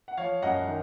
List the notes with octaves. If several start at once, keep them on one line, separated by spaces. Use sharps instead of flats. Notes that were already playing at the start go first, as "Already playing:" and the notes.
F#5
F3 C#5 F5
F#2 D#5 F#5
D#3